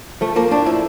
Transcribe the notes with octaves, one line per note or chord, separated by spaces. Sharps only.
F3 A3
F3 A#3
A2 D4
F3 E4